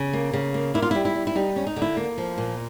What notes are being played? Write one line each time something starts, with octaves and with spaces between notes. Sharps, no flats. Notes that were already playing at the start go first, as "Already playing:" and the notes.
Already playing: C#3
A#3
C#3
A#3
A#3 E4
F4
G3 E4
E4
G3
E4
G3 D#4
C#4
D#4
D3
E4
A#3
F3
A#2